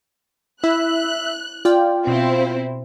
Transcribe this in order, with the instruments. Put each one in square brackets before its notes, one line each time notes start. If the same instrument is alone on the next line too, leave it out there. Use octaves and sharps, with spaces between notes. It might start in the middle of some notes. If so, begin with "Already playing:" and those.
[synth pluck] E4 [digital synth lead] E5 [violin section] F#6
[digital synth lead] F4 [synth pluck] D5 G5
[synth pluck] B2 [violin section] C4 E4 C5